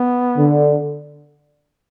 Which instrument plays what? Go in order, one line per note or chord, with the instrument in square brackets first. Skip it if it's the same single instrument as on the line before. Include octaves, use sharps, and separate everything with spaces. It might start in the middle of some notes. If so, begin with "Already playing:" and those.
Already playing: [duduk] B3
[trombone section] D3